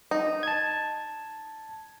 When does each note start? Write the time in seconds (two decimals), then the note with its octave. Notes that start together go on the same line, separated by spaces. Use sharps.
0.11 D#4
0.43 A5 G#6